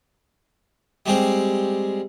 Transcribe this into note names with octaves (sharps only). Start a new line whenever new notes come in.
G3 G#3 C4 G4